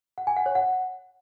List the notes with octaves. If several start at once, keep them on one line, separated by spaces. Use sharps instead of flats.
F#5
G#5
F#5
C#5
F#5